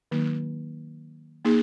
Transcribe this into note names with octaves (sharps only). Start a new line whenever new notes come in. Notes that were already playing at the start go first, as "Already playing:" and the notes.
D#3 F#3 A#3 D#4
A#3 D#4 G#4